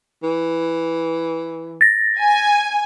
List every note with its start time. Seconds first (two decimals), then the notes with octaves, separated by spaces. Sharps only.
0.23 E3
1.81 A6 A#6
2.19 G#5